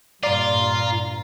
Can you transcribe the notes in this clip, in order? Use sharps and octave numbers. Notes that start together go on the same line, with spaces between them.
G2 A#2 F4 D5 A#5